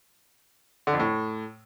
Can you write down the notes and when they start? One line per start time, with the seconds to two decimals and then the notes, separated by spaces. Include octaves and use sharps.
0.87 D3
0.93 F2
1.00 A2